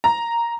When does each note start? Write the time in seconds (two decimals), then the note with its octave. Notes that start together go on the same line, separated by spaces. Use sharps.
0.04 A#5